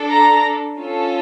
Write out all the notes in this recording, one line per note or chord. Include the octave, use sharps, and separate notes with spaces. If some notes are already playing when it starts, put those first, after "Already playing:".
Already playing: D4 A4
A#5
C#4 F4 A4